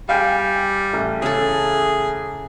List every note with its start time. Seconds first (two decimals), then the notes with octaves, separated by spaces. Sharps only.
0.09 G3 F5 G5 G#5
0.93 A1
1.22 C#3 G#4 A4